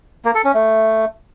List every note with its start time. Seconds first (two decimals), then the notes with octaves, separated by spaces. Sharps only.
0.25 A#3
0.35 A4
0.44 C#4
0.54 A3